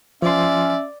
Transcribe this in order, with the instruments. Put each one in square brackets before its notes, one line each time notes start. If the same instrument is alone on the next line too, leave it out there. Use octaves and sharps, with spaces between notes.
[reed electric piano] F3 C6 [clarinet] C#4 [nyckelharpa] D5 [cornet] E5